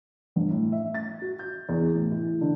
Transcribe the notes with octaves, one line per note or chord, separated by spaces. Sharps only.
G1
A2
E5
A6
F#4
G6
E2
A2
E3
D3